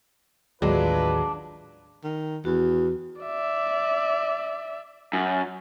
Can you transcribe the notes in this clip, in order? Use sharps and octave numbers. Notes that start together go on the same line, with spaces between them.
A1 D#2 F#3 G#3 A3 D4 F4 B4
D#3
E2 F#4
D5 E5
F#2